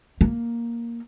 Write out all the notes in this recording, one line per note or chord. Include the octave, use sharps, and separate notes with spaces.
A#3